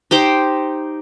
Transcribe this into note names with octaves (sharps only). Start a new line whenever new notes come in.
D#4 G4 C5 G5